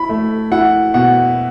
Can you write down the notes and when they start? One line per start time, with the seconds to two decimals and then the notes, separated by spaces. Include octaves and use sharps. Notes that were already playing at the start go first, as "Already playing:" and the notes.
Already playing: E4 B5
0.09 A3
0.52 E4 F#5
0.94 B2 F#5